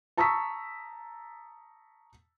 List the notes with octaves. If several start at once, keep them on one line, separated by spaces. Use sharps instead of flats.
A5 A#5 C#6 D#6 E6 B6